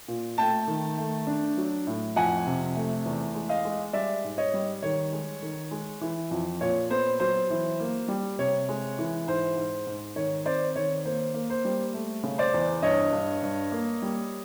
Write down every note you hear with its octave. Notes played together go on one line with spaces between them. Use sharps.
A#2
A3 G5 A5
D#3
A3
D4
F#3
A2
F2 F#5 G#5
C3
A3
E2
G#3
D#5 F5
G#3
G3 D5 E5
G#2
C#5 D#5
G3
D#3 C#5
G#3
D#3
G#3
E3
F2
A#2 C#5
B3 C5
F#3 C5
E3
A#3
G3
C3 C#5
G#3
E3
G#2 C5
G#2
G#2
D#3 C#5
C4 C5 D5
D#3 C#5
A#3 C5
A#3
C5
G3
A3
C#3
C5 D5
E2
G2 C#5 D#5
G2
G2
A#3
G3